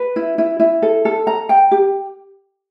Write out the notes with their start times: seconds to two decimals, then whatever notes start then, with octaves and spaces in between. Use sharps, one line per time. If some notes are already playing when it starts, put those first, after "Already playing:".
Already playing: B4
0.16 E4
0.38 E4
0.60 E4
0.82 A4
1.05 A4
1.27 A#5
1.49 G5
1.71 G4